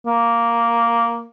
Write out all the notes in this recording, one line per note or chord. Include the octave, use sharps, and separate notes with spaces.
A#3